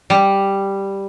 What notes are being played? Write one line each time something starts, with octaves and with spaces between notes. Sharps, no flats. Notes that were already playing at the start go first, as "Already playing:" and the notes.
G3